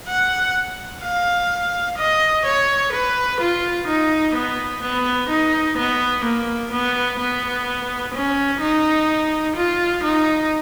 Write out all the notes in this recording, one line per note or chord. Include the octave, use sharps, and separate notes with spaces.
F#5
F5
D#5
C#5
B4
F4
D#4
B3
B3
D#4
B3
A#3
B3
B3
C#4
D#4
F4
D#4